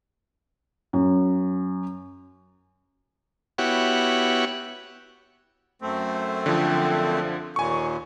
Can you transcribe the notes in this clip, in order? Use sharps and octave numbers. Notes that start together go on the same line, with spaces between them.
F#2
B3 E4 F#4 G4 C#5 F#5
F#2 A3 C4
D3 F3
D#2 A#2 G#5 C#6